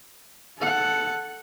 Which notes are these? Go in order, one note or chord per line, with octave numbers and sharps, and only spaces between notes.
A4 F#5